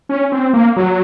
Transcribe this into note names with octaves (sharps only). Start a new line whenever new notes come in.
C#4
C4
A#3
F#3